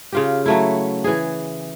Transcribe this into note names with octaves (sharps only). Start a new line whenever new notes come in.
C#3 F4 G4
F#3 A3 E4
E3 G#4